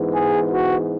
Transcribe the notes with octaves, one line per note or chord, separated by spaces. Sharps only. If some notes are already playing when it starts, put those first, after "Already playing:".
Already playing: G#2 E3 G#3 B3
G#4
F#4